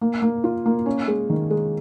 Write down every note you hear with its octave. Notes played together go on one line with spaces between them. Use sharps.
A#3
A#3
F4
A#3
C#4
G#3
D#3
G#3